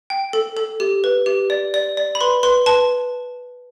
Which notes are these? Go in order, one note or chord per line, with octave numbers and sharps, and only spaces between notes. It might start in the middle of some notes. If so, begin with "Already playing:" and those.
G5
A4
A4
G4
B4
G4
D5
D5
D5
B5
B4 C6
B4 C6
B4 A5